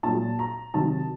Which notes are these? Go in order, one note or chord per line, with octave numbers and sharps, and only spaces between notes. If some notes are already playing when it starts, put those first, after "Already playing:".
A#2 F#3 A5
A#5
C3 D#3 F#3 A5